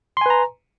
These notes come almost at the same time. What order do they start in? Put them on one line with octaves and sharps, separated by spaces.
C6 G#5 B4 A#5